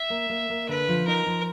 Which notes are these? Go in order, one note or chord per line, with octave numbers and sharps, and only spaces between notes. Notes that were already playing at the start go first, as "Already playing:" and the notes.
Already playing: E5
A#3
A#3
A#3
D3 B4
F3
D#4 A#4
F3